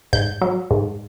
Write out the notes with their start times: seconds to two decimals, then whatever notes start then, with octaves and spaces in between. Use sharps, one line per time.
0.13 G#2 G6
0.41 F#3
0.71 G#2